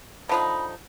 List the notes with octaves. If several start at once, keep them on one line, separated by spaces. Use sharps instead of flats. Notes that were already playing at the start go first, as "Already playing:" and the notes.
D3 F3 D#4 B5